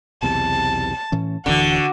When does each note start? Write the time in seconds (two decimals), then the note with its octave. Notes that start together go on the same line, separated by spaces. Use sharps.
0.23 B1 E2 C3 A5
1.12 A2 E3 C#4
1.46 D1 D3 E3 F#4